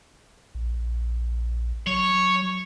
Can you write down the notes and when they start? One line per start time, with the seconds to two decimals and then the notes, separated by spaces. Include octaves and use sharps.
0.55 A#1
1.87 F#3 C#5